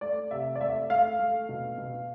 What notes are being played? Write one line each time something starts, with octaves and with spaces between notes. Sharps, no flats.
A3 D5
C3 E5
D5
A3 E5
A3 F5
A3
B2
B2